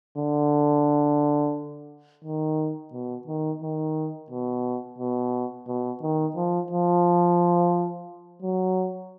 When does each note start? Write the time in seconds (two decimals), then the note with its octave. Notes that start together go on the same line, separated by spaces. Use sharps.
0.18 D3
2.25 D#3
2.93 B2
3.27 D#3
3.62 D#3
4.30 B2
4.98 B2
5.67 B2
6.02 D#3
6.36 F3
6.71 F3
8.42 F#3